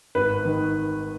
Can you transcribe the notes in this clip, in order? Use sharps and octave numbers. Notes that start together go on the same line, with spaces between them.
G#1 B4
D#3